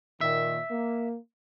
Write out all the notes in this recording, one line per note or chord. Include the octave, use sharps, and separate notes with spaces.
A#2 D#3 E5
A#3